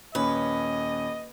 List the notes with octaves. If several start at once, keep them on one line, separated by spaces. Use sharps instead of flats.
D#1 C#4 B4 D#5